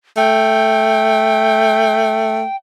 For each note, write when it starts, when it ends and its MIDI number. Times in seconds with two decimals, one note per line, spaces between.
0.17 2.44 57
0.17 2.56 79